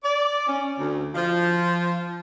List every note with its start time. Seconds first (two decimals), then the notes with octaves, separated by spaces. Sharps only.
0.03 D5
0.46 C#4
0.78 D2
1.15 F3